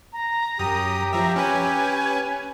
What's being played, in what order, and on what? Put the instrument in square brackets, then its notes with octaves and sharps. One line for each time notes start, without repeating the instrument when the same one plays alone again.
[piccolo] A#5
[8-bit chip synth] F#2 D#6 [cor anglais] G4
[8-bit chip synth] F3 E5 [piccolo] A#5
[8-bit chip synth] C#4 B4 [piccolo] G#5